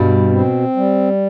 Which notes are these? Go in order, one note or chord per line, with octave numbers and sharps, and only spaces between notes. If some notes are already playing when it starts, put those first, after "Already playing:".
Already playing: G2 B2 G3
C4
G3